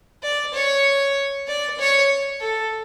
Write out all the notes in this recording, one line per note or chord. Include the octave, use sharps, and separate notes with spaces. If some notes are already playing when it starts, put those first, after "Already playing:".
D5
C#5
D5
C#5
A4